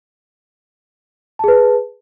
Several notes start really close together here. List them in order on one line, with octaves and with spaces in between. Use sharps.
A5 G#4 B4